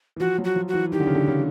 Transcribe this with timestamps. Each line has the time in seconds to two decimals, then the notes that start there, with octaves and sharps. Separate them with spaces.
0.16 E3
0.20 F3 F#4
0.38 F#3
0.44 F#4
0.56 F3
0.68 F#4
0.74 E3
0.92 D#3 G4
1.00 D3
1.07 C#3
1.15 D3
1.28 C#3